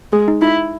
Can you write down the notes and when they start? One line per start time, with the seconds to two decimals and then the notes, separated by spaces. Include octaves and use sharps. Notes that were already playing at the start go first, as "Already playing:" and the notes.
0.12 G#3 G#4
0.28 D#4
0.41 D#4 E4